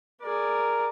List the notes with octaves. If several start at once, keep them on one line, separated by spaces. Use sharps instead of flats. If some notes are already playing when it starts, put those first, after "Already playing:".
G#4 A#4 D5